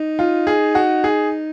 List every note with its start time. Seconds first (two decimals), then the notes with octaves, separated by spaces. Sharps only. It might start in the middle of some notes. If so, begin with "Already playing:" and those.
Already playing: D#4
0.19 F4
0.47 G#4
0.75 F#4
1.04 G#4